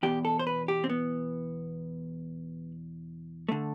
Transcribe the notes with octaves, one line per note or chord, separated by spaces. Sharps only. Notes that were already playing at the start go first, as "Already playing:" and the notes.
E2 B2 G4
A4
C5
B4
G4
C4
B3
D3 A3